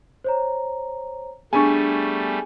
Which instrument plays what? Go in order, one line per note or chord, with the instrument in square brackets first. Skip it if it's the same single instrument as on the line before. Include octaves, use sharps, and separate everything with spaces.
[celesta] C5 C#5 A#5
[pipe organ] G3 A3 [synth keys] B3 D4 [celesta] G#4 [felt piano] G#5 C#6